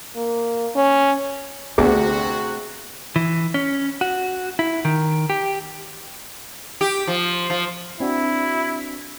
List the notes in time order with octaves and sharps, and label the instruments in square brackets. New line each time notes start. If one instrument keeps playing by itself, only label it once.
[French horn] A#3
C#4
[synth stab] D2 [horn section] C3 F#4 [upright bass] A3 B3 [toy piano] G#4
[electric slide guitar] E3
C#4
F#4
E4
D#3
G4
[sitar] G4
F3
F3
[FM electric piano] C4 D4 F#4 [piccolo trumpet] E4